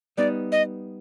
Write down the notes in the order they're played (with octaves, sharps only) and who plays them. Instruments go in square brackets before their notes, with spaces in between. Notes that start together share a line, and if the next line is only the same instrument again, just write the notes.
[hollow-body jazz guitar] G3 B3 D#4 [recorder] D5
[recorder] D#5